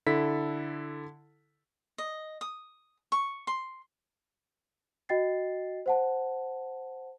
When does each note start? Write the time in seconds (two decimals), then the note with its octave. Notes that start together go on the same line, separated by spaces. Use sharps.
0.07 D3 E4 A4 B6
1.98 D#5
2.41 D#6
3.12 C#6
3.47 C6
5.09 F#4 D#5 G5 A6 C7
5.86 C5 F#5 A5